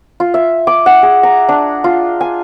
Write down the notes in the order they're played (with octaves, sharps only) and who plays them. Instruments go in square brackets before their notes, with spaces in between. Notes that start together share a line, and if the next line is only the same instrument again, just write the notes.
[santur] F4
E5
D6
F#5
G#4
A#5
D4
F4
G#5